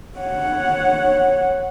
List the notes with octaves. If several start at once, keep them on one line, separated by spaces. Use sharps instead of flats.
C#5 F#5